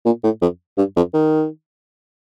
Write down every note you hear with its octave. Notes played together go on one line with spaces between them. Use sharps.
A#2
A2
F2
G2
F2
D#3